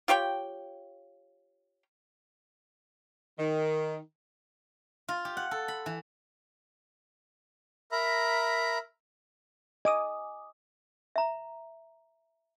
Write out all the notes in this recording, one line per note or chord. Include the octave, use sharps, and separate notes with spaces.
F4 G4 C#5 G5
D#3
F4
G4
F#5
A4
B5
E3
A#4 E5 A#5 B5
D#5 G#5 D6 D#6
E5 A#5